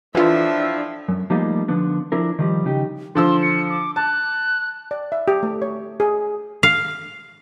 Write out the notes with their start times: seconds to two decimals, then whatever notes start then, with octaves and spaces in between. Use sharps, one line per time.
0.15 A2 E3 F3 D4 F4 E5
1.09 F#2
1.30 F3 G3 A3 A#3 D#4 F4
1.68 D3 F3 B3 D4
2.12 F3 D4 E4 A#4
2.39 D#3 F3 G3
2.65 C#3 D#4 G4
3.15 D3 F3 C6 E6
3.42 C#7
3.70 D6
3.96 A5 F#6
4.91 D5
5.12 E5
5.28 G4
5.43 A3
5.62 C#5
6.00 G#4
6.63 F5